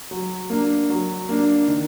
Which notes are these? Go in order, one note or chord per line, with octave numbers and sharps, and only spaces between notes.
F#3
A#3 D4
F#3
A#3 D4
D#3